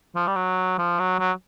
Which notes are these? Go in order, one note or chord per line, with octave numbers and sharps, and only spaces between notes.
F3
G3
F#3
F3
F#3
F#3